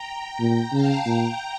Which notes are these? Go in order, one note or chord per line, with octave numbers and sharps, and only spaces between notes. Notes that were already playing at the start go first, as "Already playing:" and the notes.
Already playing: G5 A#5
A#2
C#3 F5 A5
A#2 G5 A#5